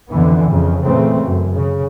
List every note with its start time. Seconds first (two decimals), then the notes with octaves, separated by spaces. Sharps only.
0.10 F2 D3 E3 B3
0.48 F2 C#3
0.83 A#2 C#3 E3 A3 C4
1.22 F#2
1.55 C#3